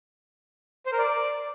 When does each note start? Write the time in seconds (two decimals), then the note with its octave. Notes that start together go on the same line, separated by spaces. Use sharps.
0.86 C5
0.92 A#4
0.98 D5